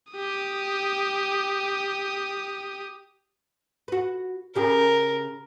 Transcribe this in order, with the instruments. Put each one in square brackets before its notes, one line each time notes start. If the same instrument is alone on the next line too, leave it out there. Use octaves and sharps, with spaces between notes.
[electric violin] G4 D#6
[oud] F#4 B4
[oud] C#3 G4 G#4 [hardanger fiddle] A#4